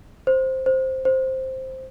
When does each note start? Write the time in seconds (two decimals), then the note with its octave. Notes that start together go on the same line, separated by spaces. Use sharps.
0.27 C5
0.66 C5
1.05 C5